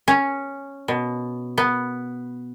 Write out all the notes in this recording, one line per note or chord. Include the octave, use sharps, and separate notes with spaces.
C#4
B2
B3